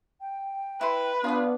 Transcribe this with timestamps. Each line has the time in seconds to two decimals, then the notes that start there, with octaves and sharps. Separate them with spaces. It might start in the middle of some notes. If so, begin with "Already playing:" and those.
0.20 G5
0.81 E4 B4 C6
1.24 B3 D4 F4 G#4 F5